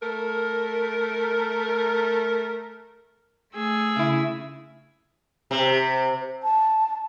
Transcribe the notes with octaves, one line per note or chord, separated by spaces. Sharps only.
A3 A#4
A3 G#4 E6
C#3 E4
C3
A5